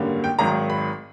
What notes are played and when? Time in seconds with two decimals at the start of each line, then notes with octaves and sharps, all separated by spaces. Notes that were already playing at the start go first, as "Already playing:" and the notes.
Already playing: G#1 F#2 D3 G3 A#3
0.24 G5
0.39 G#1 G#2 D#3 F#3 A#5
0.70 B5